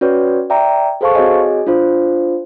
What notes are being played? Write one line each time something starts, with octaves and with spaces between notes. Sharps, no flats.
C#4 F#4 B4 C#5 D5
D5 E5 G5 A#5
G#4 A4 C5 F5 A5 C#6
C4 F#4 G#4 C#5 D#5 G#5
D4 F4 C5